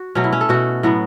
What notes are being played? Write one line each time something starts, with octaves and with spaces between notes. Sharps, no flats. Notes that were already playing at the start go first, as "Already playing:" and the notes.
Already playing: F#4
B2 F#3 A3 C#4
E4
C#4
A4
B2 A3 F#4
A2 F#3 B3